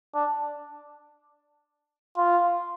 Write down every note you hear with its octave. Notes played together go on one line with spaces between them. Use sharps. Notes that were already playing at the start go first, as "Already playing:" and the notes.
D4
F4